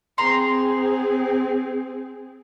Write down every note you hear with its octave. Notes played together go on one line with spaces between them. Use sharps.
C4 G#4 A#5 C6